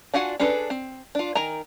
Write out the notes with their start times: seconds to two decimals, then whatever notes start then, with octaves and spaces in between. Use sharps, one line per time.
0.14 D4 F4 F#4 F#5 G#5
0.39 C#4 D4 G#4 A4 B4
0.70 C4
1.15 D4 F4
1.35 D#3 A#4 G#5 A#5